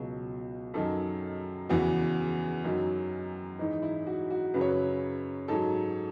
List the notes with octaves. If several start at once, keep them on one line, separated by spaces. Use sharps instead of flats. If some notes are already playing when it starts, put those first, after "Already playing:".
Already playing: C#2 B2 F#3
F#2 D#3 F#3 A4
E2 C#3 E3 F#4
F#2 D#3 F#3
G#2 E3 D#4
E4
F#4
F#4
F#2 C#3 F#3 B4
C#5
B4
G#2 F#3 A4